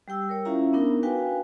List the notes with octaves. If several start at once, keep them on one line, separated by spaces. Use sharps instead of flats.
G3 G4 G5 E6
A#4 C#5
C#4 E4 F4 E5 F5 A#5
B3 D4 D#4 A#4
F#4 B4 F5 G5 G#5